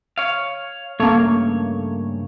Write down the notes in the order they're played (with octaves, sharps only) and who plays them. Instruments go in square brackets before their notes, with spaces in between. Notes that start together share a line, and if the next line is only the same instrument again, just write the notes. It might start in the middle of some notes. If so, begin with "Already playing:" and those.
[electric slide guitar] C#5 F5
[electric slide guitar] G2 C#3 C#5 [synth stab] A3 A#3